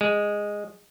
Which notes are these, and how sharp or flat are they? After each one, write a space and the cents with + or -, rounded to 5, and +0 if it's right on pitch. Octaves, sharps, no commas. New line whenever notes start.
G#3 -10